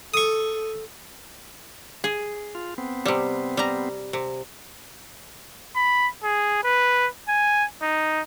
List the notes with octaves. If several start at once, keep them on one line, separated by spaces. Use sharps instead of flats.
A4 C#6 D#6
G#4
F4
B3 C4
C3 G3
G3 A#5
C3
B5
G#4
B4
G#5
D#4